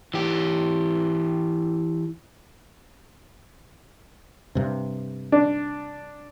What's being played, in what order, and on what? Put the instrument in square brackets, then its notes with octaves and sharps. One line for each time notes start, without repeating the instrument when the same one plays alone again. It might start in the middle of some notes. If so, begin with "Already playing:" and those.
[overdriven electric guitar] E3 G4
[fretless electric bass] G2 C3
[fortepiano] D4